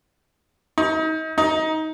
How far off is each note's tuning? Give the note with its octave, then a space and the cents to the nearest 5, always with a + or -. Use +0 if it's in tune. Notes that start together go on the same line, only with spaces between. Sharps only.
D#4 +35
D#4 +20